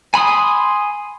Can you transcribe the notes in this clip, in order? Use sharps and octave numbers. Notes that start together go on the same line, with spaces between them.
G#5 B5 C6 D#6